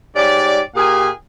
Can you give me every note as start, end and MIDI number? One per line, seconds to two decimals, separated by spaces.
0.15 0.60 44
0.15 0.60 67
0.15 0.60 73
0.15 0.60 74
0.75 1.08 46
0.75 1.08 67
0.75 1.08 68
0.75 1.08 70
0.75 1.08 77
0.75 1.08 80